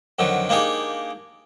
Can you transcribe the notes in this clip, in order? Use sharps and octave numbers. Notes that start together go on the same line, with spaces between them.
F2 D3 D#3 F#3
A#3 D4 D#4 G4 G#4